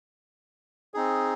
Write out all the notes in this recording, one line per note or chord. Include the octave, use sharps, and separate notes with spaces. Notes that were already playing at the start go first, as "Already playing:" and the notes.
C4 D#4 G#4